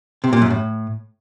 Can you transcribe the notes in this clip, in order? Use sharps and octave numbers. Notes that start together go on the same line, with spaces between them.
C3
A#2
F#2
A2